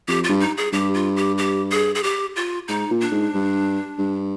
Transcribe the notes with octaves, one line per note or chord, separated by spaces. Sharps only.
F2 G4
F4
G2
D#4
G#4
G2 G4
F4
G4
G4
G#4
G#4
G4
F4
G#2 D#4
A#2
D4
G#2
G2
G2